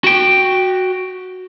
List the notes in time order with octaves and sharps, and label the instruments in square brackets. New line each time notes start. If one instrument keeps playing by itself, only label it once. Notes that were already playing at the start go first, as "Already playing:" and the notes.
[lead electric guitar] F#4 G5